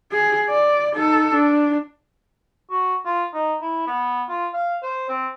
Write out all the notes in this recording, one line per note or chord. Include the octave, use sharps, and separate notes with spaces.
G#4
D5
D#4 A4
D4
F#4
F4
D#4
E4
B3
F4
F5
C5
C4